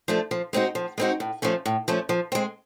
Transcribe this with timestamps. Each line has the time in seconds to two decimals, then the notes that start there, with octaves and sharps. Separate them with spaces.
0.08 F3 A3 D4
0.31 F3
0.53 G#3 C4 D#4 F#4
0.75 F3
0.98 G#3 C4 D#4 F#4
1.20 A2
1.42 F3 A3 C#4
1.66 A2
1.88 F3 A3 C#4
2.09 F3
2.32 G#3 C4